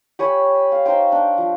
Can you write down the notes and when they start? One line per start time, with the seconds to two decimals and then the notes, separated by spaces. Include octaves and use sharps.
0.19 G4 C#5 G#5 B5
0.72 F5
0.86 D#4 C5 G5
1.12 D4
1.38 F3